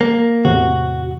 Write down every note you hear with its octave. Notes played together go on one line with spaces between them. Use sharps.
A#3
E2 A2 C3 F#4